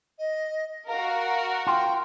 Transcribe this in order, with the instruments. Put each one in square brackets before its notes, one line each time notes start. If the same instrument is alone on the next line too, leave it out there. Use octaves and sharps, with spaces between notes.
[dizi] D#5
[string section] F#4 A#4 [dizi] F5
[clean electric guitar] F4 [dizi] G5